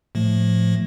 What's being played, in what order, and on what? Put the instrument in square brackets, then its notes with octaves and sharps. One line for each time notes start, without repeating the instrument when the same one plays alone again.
[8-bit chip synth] A2 F3 A3